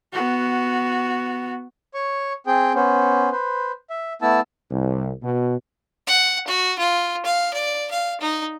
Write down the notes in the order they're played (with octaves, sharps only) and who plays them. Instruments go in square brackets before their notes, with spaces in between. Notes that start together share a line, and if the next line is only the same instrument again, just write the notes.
[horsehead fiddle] B3 F#4
[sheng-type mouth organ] C#5 C#6
C4 G#4 G5
B3 C#4 C5
B4 C5
E5
A3 B3 E4 A5 E6
[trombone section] C2
B2
[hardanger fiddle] F#5
F#4
F4
F5
D5
F5
D#4